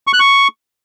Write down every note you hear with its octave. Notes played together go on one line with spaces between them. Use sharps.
C#6
F#6
C#6